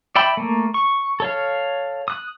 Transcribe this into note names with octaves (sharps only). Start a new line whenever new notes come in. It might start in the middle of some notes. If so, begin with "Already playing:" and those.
D5 E5 G5 B5
A3 A#3
C#6
A4 C#5 F5
D#6 F#6